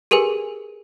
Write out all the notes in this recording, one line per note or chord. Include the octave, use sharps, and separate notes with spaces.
G4 G#4 A#4 B4 G#5